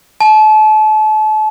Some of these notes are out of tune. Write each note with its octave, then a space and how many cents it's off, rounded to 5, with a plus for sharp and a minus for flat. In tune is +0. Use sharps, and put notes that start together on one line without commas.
A5 -35